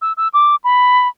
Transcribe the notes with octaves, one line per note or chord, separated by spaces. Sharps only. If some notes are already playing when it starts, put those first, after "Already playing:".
E6
E6
D6
B5